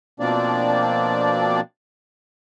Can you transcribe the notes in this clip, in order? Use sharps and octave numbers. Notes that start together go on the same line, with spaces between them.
B2 F3 A#3 C4 D4 D5